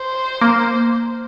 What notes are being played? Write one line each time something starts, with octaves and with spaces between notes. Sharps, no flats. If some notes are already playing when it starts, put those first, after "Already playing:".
Already playing: C5
A#3